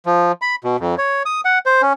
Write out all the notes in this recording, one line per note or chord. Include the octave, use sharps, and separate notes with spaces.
F3
B5
B2
F2
C#5
D#6
F#5
C5
C#4